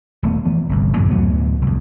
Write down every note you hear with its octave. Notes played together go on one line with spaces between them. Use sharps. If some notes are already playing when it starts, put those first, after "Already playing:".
D#1 A3 B3
E3 F3 B3
G1 C2
F#2 A#2 D3 E3
D2 A2 F#3 B3
C2 F2